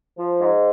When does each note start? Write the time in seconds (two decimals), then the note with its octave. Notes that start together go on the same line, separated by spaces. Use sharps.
0.17 F3
0.40 G#2